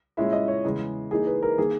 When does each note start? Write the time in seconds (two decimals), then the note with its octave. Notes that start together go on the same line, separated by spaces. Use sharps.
0.17 A#2 G#3 C#4 E4 E5
0.33 D#5
0.48 C#5
0.64 E2 C#3 G#3
1.11 E3 A#3 D#4 G#4
1.27 B4
1.43 A#4
1.58 D#3 A#3 G#4